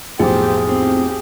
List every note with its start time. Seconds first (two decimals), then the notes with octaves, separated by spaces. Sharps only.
0.19 B1 F2 A2 G4 G#4 C5
0.69 C4 G4